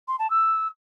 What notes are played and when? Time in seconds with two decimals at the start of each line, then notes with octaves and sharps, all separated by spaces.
0.08 C6
0.19 A5
0.30 E6